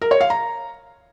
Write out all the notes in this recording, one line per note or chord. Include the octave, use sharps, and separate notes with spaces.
A#4
C#5
F5
A#5